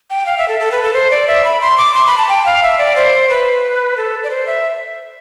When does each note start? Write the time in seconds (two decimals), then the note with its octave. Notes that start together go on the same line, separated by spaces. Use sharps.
0.10 G5
0.26 F5
0.38 E5
0.48 A4
0.60 A4
0.72 B4
0.83 A4
0.94 C5
1.11 D5
1.27 E5
1.44 B5
1.61 C6
1.77 D6
1.94 C6
2.07 B5
2.18 A5
2.29 G5
2.46 F5
2.63 E5
2.78 D5
2.96 C5
3.30 B4
3.97 A4
4.24 D5
4.30 C5
4.47 E5